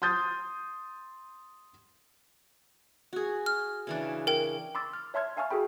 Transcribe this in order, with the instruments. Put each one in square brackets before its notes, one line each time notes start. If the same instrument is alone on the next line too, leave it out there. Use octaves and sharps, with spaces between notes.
[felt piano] C6 D#6 G6 A6
[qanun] F#4 G#4
[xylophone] F6
[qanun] C#3 E3 D4
[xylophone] A#4 G5
[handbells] B5 C6 D6 E6 A6
F6
C#5 E5 A5 C6 F6 G#6
E5 F5 G#5 A5 C#6 F6
F#4 G#4 A4 G5 B5